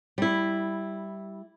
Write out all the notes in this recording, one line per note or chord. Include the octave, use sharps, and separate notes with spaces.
G3 E4